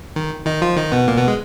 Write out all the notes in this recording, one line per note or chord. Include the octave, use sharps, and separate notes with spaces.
D#3
D#3 D#4
F3 F4
D#3 D#4
B2 B3
A#2 A#3
B2 B3
G#3